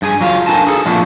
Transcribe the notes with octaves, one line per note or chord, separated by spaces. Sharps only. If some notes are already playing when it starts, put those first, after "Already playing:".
G2 G#4 G#5
F#3 F4 F5
D4 D#4 A4 A#4 G#5 A5
G#4 A4
E2 A#2 E3 F3 D4 F#4